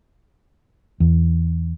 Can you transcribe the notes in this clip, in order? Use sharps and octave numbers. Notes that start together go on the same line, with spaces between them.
E2